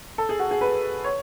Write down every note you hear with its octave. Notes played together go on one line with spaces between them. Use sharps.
A4
G#4
F#4
G#4
B4
C#5